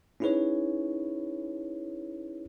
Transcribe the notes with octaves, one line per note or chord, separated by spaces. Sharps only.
C#4 D#4 E4 G#4 B4 C#5